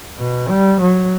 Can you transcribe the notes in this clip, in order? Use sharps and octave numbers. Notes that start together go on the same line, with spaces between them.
B2
G3
F#3